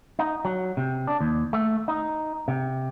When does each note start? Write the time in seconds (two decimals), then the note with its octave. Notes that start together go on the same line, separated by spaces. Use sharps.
0.19 D#4
0.45 F#3
0.77 C3
1.07 D4
1.21 D#2
1.53 A3
1.88 D#4
2.48 C3